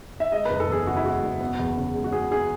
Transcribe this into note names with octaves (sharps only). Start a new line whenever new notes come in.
E5
G#3 D#5
F#1 B4
A4
E2 G#4
C#3 F#4
E4
G#3 F#4
F#1
B3
E2
C#3
G#3
F#4
B3 G#4
G#4